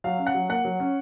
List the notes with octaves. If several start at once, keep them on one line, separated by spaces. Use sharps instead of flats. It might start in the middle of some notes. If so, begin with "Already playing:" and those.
F#3 F5
C#4
F#5
F#3
A#3 F#5
F#3
C#4